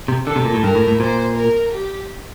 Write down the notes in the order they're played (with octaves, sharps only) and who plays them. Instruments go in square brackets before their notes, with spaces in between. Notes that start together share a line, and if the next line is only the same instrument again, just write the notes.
[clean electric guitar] C3
[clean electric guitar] D3 [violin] A4
[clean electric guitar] C3
A#2
A2
[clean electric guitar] G2 [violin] A#4
[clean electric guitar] A2
A2
[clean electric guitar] A#2 [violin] C5
[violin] A#4
G4